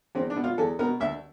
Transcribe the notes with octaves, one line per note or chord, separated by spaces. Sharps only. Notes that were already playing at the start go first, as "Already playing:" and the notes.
E2 C4
D4
B2
F4
E2 A4
B2 A#4
D2 E5